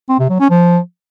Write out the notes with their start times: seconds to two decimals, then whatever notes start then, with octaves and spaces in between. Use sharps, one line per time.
0.09 C4
0.19 C3
0.29 F#3
0.40 C#4
0.50 F3